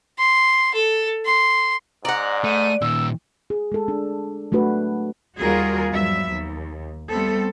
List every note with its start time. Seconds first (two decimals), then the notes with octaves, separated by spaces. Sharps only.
0.18 C6
0.74 A4
1.25 C6
2.05 G#2 D5 F#5 A#5
2.44 A3 D#7
2.81 A#2 D#3 E6
3.50 G#4
3.72 G#3 A4
3.88 D4
4.52 F#3 A3 D4 F#4 B4
5.41 D#2 G3 F4 F#4 G#4 A#4
5.92 G2 F3 F#3 B3 E5
6.31 D#2
7.11 G3 A3 B3 C4 A4